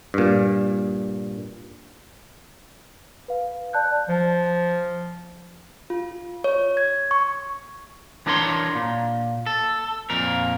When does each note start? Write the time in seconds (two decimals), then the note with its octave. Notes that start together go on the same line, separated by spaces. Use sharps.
0.14 G2 A#2
3.28 B4 F5
3.73 D5 A5 F#6 G6
4.09 F3
5.90 F4
6.44 C#5
6.77 G#6
7.11 C#6
8.26 E3 D4 A#4 C#5 C6
8.75 A#2
9.46 A4
10.10 F2 A#2 A#4